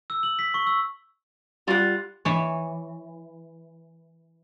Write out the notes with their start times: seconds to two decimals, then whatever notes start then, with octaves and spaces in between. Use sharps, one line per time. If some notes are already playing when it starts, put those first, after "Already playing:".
0.10 E6
0.23 F#7
0.39 B6
0.54 C#6
0.67 E6
1.68 G3 F4 F#5
2.25 E3 C#5